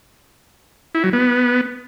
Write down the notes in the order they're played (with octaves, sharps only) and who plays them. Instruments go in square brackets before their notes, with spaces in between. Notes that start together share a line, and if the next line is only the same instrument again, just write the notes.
[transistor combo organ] E4
F#3
B3